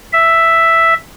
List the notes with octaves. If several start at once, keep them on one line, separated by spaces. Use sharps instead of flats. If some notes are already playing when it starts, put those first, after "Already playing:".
E5